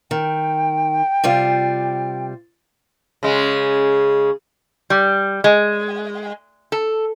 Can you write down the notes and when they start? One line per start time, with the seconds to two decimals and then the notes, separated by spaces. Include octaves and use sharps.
0.11 D#3 G5
1.24 C3 G3 F4
3.23 C#3 G#3
4.90 G3
5.44 G#3
6.72 A4